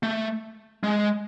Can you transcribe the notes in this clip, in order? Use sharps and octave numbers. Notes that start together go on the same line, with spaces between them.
A3
G#3